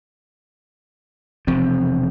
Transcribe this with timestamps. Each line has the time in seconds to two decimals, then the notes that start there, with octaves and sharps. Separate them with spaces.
1.47 E1 C3 F3 C4